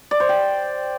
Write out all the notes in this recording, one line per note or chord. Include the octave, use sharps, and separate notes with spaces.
D5
C5
G5